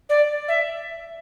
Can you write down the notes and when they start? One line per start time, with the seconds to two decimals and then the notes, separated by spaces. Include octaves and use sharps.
0.09 D5
0.48 E5